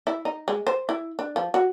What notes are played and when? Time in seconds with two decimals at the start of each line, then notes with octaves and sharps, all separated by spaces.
0.07 E4
0.25 D#4
0.48 G#3
0.67 C5
0.89 E4
1.19 D4
1.36 F3
1.54 F#4